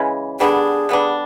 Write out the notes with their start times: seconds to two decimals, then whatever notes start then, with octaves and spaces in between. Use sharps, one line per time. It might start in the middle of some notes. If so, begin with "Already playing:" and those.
Already playing: C#3 E3 G#3
0.40 D3 G3 B3 D4 G#4
0.89 D3 G3 B3 D4